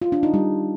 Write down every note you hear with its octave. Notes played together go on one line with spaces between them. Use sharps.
F4
D4
D#4
G3